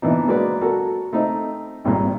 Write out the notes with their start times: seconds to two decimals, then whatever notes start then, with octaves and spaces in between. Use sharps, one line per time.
0.02 A#2 E3 B3 D4 D#4
0.27 F#3 G#3 A#3 F#4 B4 D5
0.61 F#4 A4 A#4
1.13 A3 C4 D#4
1.85 G#1 G2 A#2